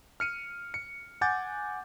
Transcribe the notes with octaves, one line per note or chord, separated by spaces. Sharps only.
F6 C#7 D#7
C#7
F#5 G#5 D6 G6 A6